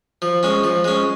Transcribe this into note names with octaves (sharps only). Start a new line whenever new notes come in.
F3
G#3 C#4
F3
G#3 C#4